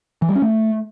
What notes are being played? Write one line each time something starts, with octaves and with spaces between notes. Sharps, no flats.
E3
G3
C#4
A3